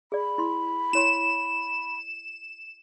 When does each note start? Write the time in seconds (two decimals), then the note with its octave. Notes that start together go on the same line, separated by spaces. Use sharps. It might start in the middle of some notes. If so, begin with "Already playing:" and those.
0.12 G#4 D5 B5
0.38 E4 C6
0.93 E4 C#5 C6 E7